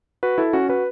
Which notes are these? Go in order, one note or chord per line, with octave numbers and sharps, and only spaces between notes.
F#4 B4
E4 A4
C#4 F#4
F#4 B4